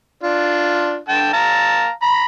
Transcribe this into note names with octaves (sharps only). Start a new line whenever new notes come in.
D4 F4
D3 G5 A5
F5 A5 A#5
A#5 B5